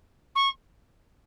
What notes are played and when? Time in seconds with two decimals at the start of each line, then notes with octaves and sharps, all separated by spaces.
0.35 C#6